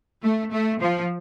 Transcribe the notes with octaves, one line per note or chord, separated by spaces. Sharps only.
A3
A3
F3